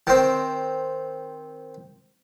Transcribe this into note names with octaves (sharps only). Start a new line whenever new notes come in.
D#3 C4